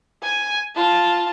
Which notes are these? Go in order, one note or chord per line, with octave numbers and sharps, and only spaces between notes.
G#5
F4 A5